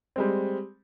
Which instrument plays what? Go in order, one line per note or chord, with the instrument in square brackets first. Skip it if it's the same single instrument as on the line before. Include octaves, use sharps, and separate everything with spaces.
[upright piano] G3 G#3 C4